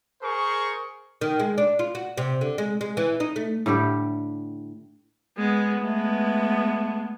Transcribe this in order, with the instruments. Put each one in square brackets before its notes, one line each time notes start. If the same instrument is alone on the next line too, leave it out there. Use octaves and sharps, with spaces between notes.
[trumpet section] G#4 A#4 C5 C#6
[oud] D#3
G#3
D4
F4
F#4
C3
D3
G#3
G#3
E3
D#4
A3
[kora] A2 D3 G3 G4
[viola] G#3 B3
[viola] G#3 B3 [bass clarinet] A3